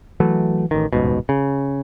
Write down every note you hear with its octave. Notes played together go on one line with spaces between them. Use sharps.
E3 F#3 A3
A1 D#3
D#1 C#2 G#2 B2
C#3